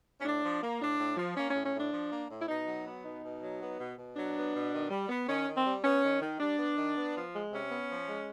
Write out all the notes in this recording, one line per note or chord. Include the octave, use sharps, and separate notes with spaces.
C#4
A2 D4
F3
A#3
A2 D4
A2
F3
A#3 C#4
A2 C#4
C#4
A2 D4
F3
A#3
A2
E4
B2 D#4
F#3
B3
B2 D#4
B2
F#3
B3
B2
B2
F#3 D4
B3
B2
D#3
G3
B3
D#3 C#4
D#3
C4
G3
B3 C#4
D#3
D#3
G3 D4
B3
D#3
B3
F3
G#3
C3 C#4
B3
F3
G#3